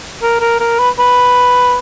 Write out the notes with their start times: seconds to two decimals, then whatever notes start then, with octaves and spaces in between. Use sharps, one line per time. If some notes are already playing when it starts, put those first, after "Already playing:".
0.22 A#4
0.41 A#4
0.60 A#4
0.79 B4
0.99 B4